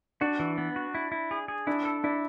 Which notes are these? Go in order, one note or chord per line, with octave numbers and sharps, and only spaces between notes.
D4 F#4
E3
B3
F#4
E4
E4
G#4
G#4
D4 E4
A4
D4 E4